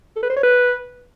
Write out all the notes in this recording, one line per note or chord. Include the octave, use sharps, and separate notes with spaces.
A4
B4
C5
C#5
B4